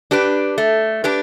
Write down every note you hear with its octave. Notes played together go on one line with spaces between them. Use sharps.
D4 G4 B4
A3
D4 G4 B4